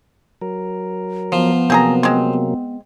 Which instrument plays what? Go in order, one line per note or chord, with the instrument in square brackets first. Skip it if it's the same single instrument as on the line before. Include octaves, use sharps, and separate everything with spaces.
[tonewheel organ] F#3 A#4
[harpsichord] F3 [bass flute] B3
[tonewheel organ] C3 F#3 A#3 [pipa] C4 G#4 A#5
[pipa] G#3 C4